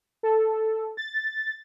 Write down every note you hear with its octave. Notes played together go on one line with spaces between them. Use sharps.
A4
A6